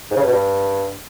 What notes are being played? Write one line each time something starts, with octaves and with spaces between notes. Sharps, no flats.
G#2
C#3
G2
B2
G2